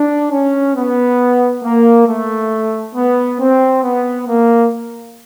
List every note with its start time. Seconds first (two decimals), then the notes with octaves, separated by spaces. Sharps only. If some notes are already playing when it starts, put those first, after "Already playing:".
Already playing: D4
0.32 C#4
0.75 B3
1.63 A#3
2.07 A3
2.95 B3
3.40 C4
3.83 B3
4.27 A#3